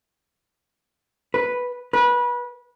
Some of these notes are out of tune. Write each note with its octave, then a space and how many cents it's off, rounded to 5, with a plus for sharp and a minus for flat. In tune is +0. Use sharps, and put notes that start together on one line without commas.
B4 -5
B4 -25